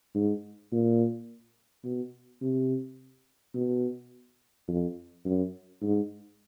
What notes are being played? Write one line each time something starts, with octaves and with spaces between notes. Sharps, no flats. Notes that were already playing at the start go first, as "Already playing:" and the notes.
G#2
A#2
B2
C3
B2
F2
F#2
G#2